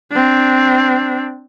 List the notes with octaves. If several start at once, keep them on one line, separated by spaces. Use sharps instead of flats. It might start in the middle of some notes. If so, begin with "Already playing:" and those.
C4 D4